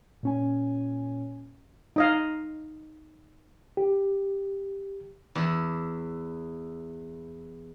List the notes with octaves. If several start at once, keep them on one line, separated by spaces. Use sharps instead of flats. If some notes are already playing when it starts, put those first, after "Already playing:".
A#2 C#4 G#5
D#4 D#5 F5
G4
E2 E4